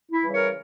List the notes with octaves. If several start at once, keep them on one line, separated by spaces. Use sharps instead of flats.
E4
C#3 E3 G3
A#4 C#5